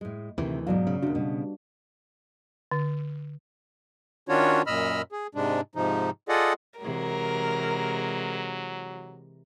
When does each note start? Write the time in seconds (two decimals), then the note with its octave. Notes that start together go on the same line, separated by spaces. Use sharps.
0.01 A2 G#3
0.38 D2 C3 D#3 E3
0.67 G#2 B2 F#3 D5 F5
0.87 C#3
1.02 D#2 C3 D4 F#4
1.15 B2 G3 B3
2.71 D3
4.29 D#3 C#4 D4 F4 F#4 C#5
4.67 F#2 A#2 D#5 B5 E6 F6
5.12 G#4
5.35 G#2 C3 G#3 D4
5.75 G#2 C3 F3 D#4
6.29 F4 G#4 A4 D5 D#5 F#5
6.80 C3 E3 F#3 G#3 A#4